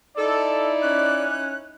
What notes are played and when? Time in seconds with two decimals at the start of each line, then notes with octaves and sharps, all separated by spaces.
0.17 D#4 E4 A4 D5
0.82 C#4 F#6